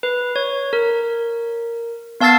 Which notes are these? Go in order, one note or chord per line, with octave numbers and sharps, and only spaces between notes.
B4
C#5
A#4
B3 F5 A5 E6 A6 C7